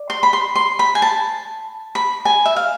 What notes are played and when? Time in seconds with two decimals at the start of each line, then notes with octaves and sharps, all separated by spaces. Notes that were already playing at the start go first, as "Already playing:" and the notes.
Already playing: D5
0.10 C6
0.23 B5
0.33 C6
0.56 C6
0.79 B5
0.95 G#5
1.02 A5
1.95 B5
2.25 G#5
2.45 E5
2.56 F5